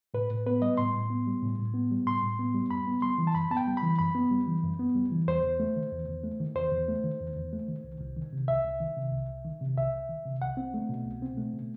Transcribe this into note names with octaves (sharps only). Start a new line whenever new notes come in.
A2 B4
A2
B3 B4
G3 D#5
A2 C6
A2
B3
G3
A2
A2
B3
G3
A2 C6
A2
B3
G3
F#2 B5
B3
G3 C6
E3
A5
F#2 B5
B3 A5
G5
G3
B5
E3
F#2 B5
B3
G3
E3
F#2
B3
G3
E3
E2 C5
E2
A3
D#3
E2
E2
A3
D#3
E2 C5
E2
A3
D#3
E2
E2
A3
D#3
C2
C2
D#3
C3
C2 E5
C2
D#3
C3
C2
C2
D#3
C3
C2 E5
C2
D#3
C3
C2 F#5
C4
A3
B2
C2
C4
A3
B2